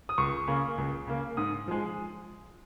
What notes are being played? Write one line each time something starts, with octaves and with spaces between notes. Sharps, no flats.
D#6
C#2 C#6
C#3 A#3
C#2
C#3 A#3
G#2 D#6
F3 G#3